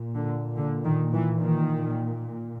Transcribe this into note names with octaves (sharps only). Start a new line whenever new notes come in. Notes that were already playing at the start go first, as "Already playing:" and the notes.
Already playing: A#2
D3
D3
D#3
E3
D#3